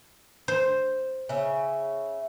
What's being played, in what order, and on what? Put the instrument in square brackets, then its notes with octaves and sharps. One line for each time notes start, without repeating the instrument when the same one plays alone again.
[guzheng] C5
[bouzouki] C#3 E5